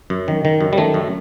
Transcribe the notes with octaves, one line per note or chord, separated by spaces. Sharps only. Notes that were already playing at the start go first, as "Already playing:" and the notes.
F#2
D#3
D#3
F#2
G3
D#3 A3
F#2